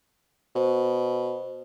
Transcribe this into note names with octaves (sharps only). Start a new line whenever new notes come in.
B2 C5